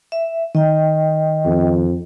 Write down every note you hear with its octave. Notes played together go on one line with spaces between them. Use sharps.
E5
D#3 D#5 G5
F2